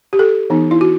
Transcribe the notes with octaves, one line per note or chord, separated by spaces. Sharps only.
G4
A4
E3 B3 D#4
E4
F#4